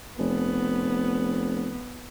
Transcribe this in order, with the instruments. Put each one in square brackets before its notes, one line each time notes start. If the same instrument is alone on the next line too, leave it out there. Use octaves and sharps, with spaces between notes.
[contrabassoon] F1 [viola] B3